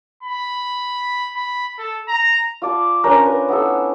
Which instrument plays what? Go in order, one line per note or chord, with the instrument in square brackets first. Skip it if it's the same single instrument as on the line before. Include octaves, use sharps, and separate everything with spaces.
[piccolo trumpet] B5
B5
A4
A#5
[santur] F4 D5 A5
C#4 D4 A#4 C5
B4
B3 E4 A4